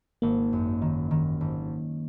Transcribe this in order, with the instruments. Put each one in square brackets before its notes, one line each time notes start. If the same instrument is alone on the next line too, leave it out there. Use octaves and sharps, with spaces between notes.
[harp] G#1 [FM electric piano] A#3
[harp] F#2
D#3
D#3
G#1